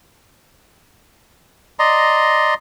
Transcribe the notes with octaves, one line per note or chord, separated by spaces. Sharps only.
D5 D#5 A#5 C6